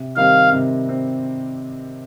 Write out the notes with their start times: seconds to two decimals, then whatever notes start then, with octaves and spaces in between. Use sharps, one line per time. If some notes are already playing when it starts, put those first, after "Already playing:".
Already playing: C3
0.17 D#3 G3 C4 F5
0.53 C3
0.89 C4